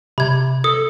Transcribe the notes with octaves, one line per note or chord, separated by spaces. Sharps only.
C3 B5 G#6
A4 D#6